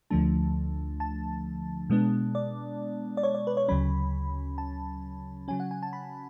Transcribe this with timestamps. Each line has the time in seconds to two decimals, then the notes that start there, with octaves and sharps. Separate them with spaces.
0.10 D2 D3 F3 A3 D4 A5
1.00 A5
1.89 B2 G#3 B3 D4
2.35 D5
3.17 D5
3.23 C#5
3.35 D5
3.47 B4
3.57 C#5
3.68 D2 C#3 F#3 C#4 B5
4.58 A5
5.48 C#3 F#3 C#4 G#5
5.60 F#5
5.71 G#5
5.83 A5
5.93 B5